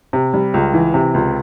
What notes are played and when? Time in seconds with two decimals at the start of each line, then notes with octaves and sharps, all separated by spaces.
0.13 C3
0.34 G3
0.54 C#2
0.74 E3
0.94 C3
1.14 C#2